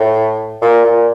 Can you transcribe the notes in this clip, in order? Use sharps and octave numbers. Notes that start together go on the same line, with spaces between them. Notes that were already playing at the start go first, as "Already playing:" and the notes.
Already playing: A2
A#2
A#2